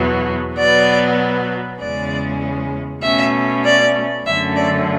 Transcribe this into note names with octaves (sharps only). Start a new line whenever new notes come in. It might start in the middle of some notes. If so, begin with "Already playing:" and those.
Already playing: E2 B2 F#3 B3
B2 F#3 B3 D5
E2 C#3 G#3 C#4 D5
B2 A3 C#4 E5
D5
F#2 D3 A3 C#4 E5
D5